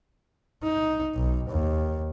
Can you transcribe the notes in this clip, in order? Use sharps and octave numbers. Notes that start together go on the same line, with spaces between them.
D#4
B1
D#2